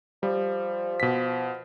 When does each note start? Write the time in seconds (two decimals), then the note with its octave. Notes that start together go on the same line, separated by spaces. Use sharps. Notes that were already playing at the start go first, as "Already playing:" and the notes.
0.23 F3 G3
1.00 B2 B6